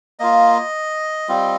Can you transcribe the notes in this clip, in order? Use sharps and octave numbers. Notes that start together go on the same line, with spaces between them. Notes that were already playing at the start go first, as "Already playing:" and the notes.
A#3 F4 D#5
G3 C4 F4